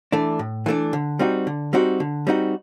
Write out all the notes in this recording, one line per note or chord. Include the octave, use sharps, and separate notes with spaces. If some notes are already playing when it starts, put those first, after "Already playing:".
E3 A3 D4
A2
E3 A3 D4
D3
G3 C4 D#4 F#4
D3
G3 C4 D#4 F#4
D3
G3 C4 D#4 F#4